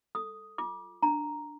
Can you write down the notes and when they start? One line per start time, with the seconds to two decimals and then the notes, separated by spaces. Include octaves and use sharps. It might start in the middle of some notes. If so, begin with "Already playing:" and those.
0.15 A4 D#6
0.58 F4 D6
1.03 D4 A#5